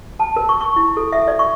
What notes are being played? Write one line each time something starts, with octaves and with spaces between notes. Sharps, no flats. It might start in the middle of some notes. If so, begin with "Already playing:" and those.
A5
A#4
C#6
C#6
E4
A4
E5
D5
C#6